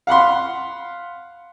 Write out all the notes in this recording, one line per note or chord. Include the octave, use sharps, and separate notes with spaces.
F5 F#5 B5 C6